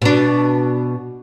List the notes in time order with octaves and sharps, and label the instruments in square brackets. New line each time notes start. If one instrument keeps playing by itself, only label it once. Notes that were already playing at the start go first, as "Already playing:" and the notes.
[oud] B2 D4